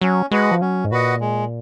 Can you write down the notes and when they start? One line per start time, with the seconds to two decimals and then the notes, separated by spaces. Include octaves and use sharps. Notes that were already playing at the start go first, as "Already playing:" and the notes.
0.01 F#3 C#4
0.31 G#3 F#4 B4 D#5 F#5
0.51 F3
0.61 F#3 C#4
0.84 G#2
0.91 A#2 F#4 B4 D#5 F#5
1.21 G#3